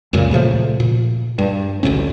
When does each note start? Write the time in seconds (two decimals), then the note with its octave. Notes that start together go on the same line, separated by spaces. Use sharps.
0.13 C#2 F#2 A#2 C#3
0.31 A#2 C#3 F3 A3
0.80 A#2
1.38 G2
1.83 A1 D2 A2 C#4